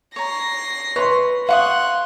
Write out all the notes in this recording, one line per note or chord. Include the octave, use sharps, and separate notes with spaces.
C#5 A#5 A#6 C7
B4 C#5 C6
F5 F#5 C6 C#6 D#6 F#6